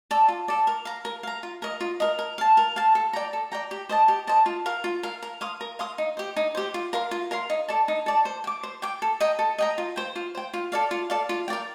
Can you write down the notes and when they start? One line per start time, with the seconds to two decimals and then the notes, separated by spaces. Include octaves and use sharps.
0.11 A4 D5
0.28 F4
0.48 A4 D5
0.67 A#4
0.85 F5 A#5
1.05 A#4
1.23 F5 A#5
1.43 F4
1.62 A#4 D#5
1.81 F4
2.00 A#4 D#5
2.19 A#4
2.38 F5 A5
2.57 A#4
2.76 F5 A5
2.95 A4
3.13 D5 G5 A#5
3.33 A4
3.52 D5 G5 A#5
3.71 G4
3.89 C5 D#5 A5
4.08 G4
4.27 C5 D#5 A5
4.46 F4
4.66 A#4 F5
4.84 F4
5.03 A#4 F5
5.23 A#4
5.41 F5 C6 D#6
5.61 A#4
5.79 F5 C6 D#6
5.98 D#4
6.17 G4 C5
6.36 D#4
6.55 G4 C5
6.74 F4
6.93 A#4 F5 C6
7.11 F4
7.31 A#4 F5 C6
7.50 D#4
7.68 A4 D5 A5
7.88 D#4
8.06 A4 D5 A5
8.25 C5
8.44 G5
8.47 D6
8.63 C5
8.82 G5 D6
9.02 A4
9.20 D#5 G5 A#5
9.39 A4
9.58 D#5 G5 A#5
9.78 F4
9.96 C5 G5
10.16 F4
10.35 C5 G5
10.54 F4
10.72 A4 D5 F5
10.91 F4
11.10 A4 D5 F5
11.29 F4
11.48 A#4 D5 G5